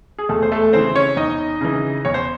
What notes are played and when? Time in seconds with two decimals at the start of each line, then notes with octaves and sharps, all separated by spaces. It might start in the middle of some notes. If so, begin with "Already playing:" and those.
0.18 G#4
0.29 E2 A3 A4
0.43 C5
0.52 A3 A4
0.73 C#3 E3 C4 C5
0.95 C#4 C#5
1.17 E2 D#4 D#5
1.61 C#3 E3
2.05 E2 C#5
2.14 C5